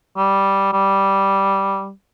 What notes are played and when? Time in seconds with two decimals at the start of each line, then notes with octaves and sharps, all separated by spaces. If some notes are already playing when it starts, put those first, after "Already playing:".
0.17 G3
0.73 G3